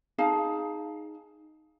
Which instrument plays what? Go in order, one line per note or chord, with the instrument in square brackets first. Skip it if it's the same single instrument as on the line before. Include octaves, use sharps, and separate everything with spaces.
[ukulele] D#4 G#4 F5 A5